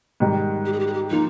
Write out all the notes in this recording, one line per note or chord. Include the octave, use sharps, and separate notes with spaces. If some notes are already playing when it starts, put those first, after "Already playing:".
G#2 D#3 G3
G4
G#4
G4
G#4
G4
F3 A#3 D#4 F4